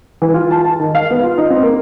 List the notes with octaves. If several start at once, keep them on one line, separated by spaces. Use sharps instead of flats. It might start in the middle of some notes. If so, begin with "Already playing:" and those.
E3
F4
A5
A5
D#3
F5
B3
F4
D#4
C4
A#3